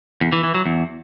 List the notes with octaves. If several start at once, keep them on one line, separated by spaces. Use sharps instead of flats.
E2
E3
E3
F#3
E2